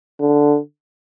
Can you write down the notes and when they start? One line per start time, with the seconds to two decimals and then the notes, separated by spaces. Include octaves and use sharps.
0.20 D3